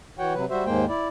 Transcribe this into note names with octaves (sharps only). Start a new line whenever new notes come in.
E3 F#4 C#5 F#5 G5
C3 F#3 B4
G3 F#4 C5 E5
D#2 G#2 G#3 A#3 C5 G5
E4 D5